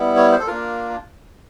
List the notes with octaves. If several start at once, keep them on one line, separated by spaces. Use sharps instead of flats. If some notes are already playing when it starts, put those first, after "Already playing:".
Already playing: G3 B3 E4
C#5
C5
A4
A#3 D4 F4 A#4